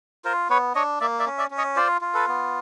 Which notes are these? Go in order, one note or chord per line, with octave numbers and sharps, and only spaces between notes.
F4 A#4 C5
B3 B4 C#5
D4 C#5 D#5
A#3 D5 E5
D5 E5
C#4
D5 E5
C#4
C#5 D#5
F4 C5 D5
F4
A4 B4
B3